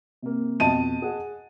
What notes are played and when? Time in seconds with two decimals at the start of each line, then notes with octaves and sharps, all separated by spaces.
0.22 C3 A#3
0.60 F2 B2 D#5 A5 D#7
1.02 G#4 F#5